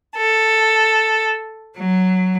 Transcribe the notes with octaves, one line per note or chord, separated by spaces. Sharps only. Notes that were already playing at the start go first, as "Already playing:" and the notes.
A4
F#3